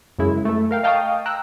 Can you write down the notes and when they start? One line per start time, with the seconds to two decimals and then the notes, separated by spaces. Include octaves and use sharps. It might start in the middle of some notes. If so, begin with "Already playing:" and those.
0.19 F#2 C#3 G#3 E4
0.45 A3 A4
0.71 A#4 F5 G5
0.83 D#5 F5 G5 A5 C#6 D#6
1.26 G5 A#5 E6 F#6